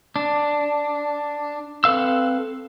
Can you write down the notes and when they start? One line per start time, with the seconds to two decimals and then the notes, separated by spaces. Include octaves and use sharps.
0.16 D4
1.84 C4 A4 B4 F5 E6